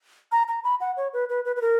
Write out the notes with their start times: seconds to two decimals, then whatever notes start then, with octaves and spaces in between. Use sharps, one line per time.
0.32 A#5
0.48 A#5
0.64 B5
0.80 F#5
0.97 C#5
1.13 B4
1.29 B4
1.45 B4
1.56 B4
1.62 A#4